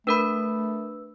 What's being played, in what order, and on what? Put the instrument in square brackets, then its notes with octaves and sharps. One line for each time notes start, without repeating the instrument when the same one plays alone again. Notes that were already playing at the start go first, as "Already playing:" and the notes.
[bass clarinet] A3 [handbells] D4 A#4 B5 [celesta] B4 E6